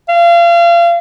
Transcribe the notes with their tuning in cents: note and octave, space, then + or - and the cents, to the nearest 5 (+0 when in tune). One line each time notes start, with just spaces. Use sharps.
F5 -30